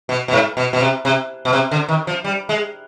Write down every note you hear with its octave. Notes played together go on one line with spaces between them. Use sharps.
B2
B2
G#2
B2
B2
C3
C3
B2
C3
D3
D#3
F3
G3
G#3